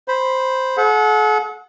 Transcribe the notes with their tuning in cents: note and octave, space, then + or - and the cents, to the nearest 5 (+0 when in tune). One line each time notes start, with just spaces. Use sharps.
C5 +0 B5 +0
A4 -45 F#5 -25